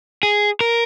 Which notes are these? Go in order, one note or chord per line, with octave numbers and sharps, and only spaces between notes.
G#4
A#4